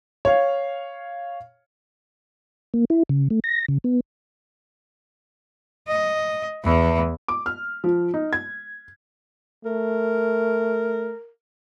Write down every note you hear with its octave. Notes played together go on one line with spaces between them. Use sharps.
C#5 F5
A#3
E4
C#3
A3
A#6
C#3
B3
D#5
E2 E3
D6
F6
F3
D#4
G#6
A3 A#4